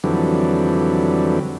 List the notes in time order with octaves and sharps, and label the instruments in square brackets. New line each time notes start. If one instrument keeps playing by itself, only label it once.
[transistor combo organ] F2 D3 E3 F#3 G3